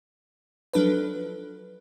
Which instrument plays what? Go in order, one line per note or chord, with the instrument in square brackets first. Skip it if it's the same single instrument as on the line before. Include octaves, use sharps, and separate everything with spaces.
[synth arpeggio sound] F3 F#3 D4 A4 B4